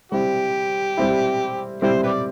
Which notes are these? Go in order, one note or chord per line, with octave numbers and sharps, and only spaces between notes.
G3 C4 E4 G4
G3 C4 E4
G3 C4 E4 G4 C5
G4 B4 D5